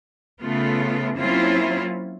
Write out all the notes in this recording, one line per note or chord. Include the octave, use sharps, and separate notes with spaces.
C#3 A3 B3 F4
F#3 A#3 C4 C#4 E4 F4